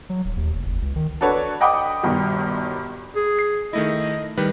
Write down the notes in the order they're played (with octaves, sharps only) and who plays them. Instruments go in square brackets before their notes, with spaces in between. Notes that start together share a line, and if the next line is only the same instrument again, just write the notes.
[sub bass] F#3
D#1
D#2
F1
F#1
C#2
D#3
[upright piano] D4 F#4 A4 B4 C#5
D#5 F#5 G5 B5 D6 D#6
G1 G2 B2 D#3
[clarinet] G#4
[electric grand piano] C7
[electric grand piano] D#3 A3 E4 [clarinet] D#5
[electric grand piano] D#3 G3 B4